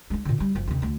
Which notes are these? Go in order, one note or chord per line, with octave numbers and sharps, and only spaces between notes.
G#3 D#4
A#2 D3
G3 D#4
F#1 F3
D#2 C#3
D2 A3